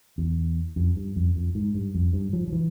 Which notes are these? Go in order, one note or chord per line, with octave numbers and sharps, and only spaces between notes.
E2
F2
G2
F2
F2
G#2
G2
F2
G2
F3
F3
E3